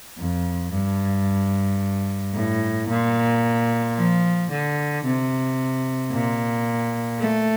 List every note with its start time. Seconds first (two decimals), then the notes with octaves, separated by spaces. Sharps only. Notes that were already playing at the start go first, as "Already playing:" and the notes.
0.18 F2
0.72 G2
2.34 A2
2.88 A#2
3.96 F3
4.50 D3
5.04 C3
6.12 A#2
7.19 A3